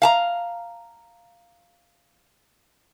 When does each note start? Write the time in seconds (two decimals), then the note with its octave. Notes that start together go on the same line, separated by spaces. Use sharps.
0.02 F5 A5 A#5